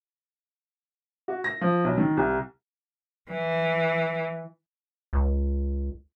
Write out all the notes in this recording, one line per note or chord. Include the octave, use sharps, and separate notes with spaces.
F#4
A#6
F3
B1
D#3
C2
E3
C#2